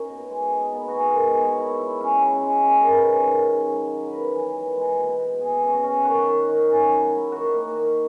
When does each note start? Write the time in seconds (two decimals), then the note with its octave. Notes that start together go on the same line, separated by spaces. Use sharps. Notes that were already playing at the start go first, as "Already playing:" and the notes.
Already playing: C#4 D#4 A#4 C#5
0.09 B2
0.30 G#3
0.52 D#4
0.73 B3
0.88 F#4
0.94 B2 G#4
1.10 A#4
1.15 G#3
1.37 B2
1.42 C#5
1.58 E4
1.79 E4
2.01 C#4
2.22 C#3
2.43 G#3
2.64 C#4
2.79 A#4
2.86 D#3 B4
3.07 C#4
3.28 D#3
3.49 C#3
3.71 F#3
3.92 F#3
4.08 B4
4.13 B3 A#4
4.34 E3
4.56 E3
4.77 G#3
4.98 B2
5.19 B2
5.41 B2 G#4
5.62 C#4
5.72 F#4
5.84 C#4
6.04 D#3 F#4
6.26 D#3
6.47 D#3
6.68 C#4
6.89 F#3
7.11 E4
7.32 D#3 F#4
7.54 A#3
7.75 D#3